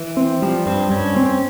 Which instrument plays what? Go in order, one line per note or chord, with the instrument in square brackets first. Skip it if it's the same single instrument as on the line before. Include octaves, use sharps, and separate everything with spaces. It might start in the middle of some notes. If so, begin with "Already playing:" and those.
Already playing: [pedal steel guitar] E3
[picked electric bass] C4
[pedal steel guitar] F3 [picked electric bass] G3
[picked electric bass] G2 [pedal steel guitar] C4
[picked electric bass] G2 [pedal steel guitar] C#4
[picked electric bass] C4